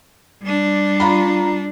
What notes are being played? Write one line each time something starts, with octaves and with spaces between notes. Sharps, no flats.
G3 D4
F4 A#5 B5